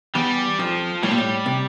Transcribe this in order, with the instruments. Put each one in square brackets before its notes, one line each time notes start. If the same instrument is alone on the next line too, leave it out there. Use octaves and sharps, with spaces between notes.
[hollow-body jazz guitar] E2 [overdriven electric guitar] G3
[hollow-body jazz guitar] F2 [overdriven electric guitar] F3
[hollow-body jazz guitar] A2 [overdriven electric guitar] G3
[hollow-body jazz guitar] A#2
A2
C3